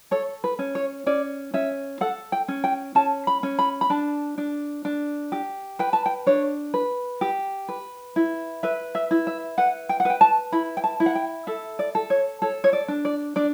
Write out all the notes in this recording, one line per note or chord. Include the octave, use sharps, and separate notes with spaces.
A4 C#5
B4
C#4
C#5
C#4 D5
C#4 E5
A4 F#5
G5
C#4
G5
C#4 A5
B5
C#4
B5
B5
D4 A5
D4
D4
G4
B4 G5
A5
G5
D4 C#5
B4
G4
B4
E4
B4 E5
E5
E4
E5
B4 F#5
G5
F#5
B4 G5
A5
E4 B5
G5
A5
E4
F#5
G5
A4 E5
D5
A4
C#5
A4 C#5
C#5
D5
D4
D5
D4 D5